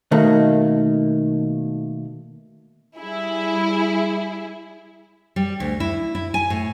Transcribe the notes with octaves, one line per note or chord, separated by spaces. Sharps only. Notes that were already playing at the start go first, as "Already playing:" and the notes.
B2 D#3 A3 A#3
G3 E4 G#4
G3
D2
E4
E4
G#5
A2